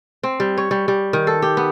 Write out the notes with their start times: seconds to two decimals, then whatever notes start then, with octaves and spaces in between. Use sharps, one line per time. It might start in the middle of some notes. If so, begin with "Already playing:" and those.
0.23 C4
0.40 G3
0.58 C#5
0.71 G3
0.88 G3
1.13 D#3
1.27 A4
1.42 G4
1.57 B3